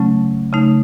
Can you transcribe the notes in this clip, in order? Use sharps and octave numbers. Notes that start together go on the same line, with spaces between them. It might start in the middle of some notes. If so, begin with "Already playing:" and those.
Already playing: C#3 F#3 A3 C#4
C#3 A3 D#4